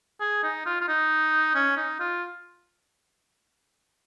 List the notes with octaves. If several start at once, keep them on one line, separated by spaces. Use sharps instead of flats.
G#4
D#4
F4
F4
D#4
C#4
D#4
F4